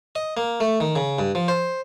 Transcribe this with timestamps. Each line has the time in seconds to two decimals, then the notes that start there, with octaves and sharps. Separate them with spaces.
0.16 D#5
0.37 A#3
0.60 A3
0.80 D#3
0.96 C#3
1.19 G2
1.35 F3
1.48 C5